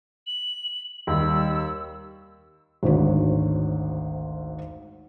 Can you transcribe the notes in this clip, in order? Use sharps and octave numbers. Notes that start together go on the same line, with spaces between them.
F#7
D#2 G3 E6
G#1 D2 G#2 C#5